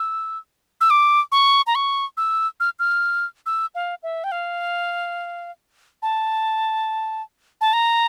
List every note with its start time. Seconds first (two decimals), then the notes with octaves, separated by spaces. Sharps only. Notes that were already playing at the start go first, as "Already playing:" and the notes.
Already playing: E6
0.81 E6
0.90 D6
1.32 C#6
1.67 A#5
1.75 C#6
2.17 E6
2.60 F6
2.79 F6
3.46 E6
3.75 F5
4.03 E5
4.24 G5
4.32 F5
6.02 A5
7.61 A5
7.73 A#5